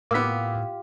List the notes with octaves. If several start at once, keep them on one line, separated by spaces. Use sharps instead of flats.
A2 A#3 B3 F4 G4 D6 E6 B6